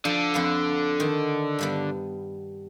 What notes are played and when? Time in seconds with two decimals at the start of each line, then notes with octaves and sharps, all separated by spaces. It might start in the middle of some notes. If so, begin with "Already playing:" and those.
0.05 D3 F3 A4
0.34 F2 B4 F5
1.00 D#3
1.59 G2 G3 B3